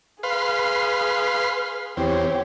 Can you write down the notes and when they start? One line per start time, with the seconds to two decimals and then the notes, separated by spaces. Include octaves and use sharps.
0.23 G#4 B4 F5 C6
1.97 E2 C4 G4 C#5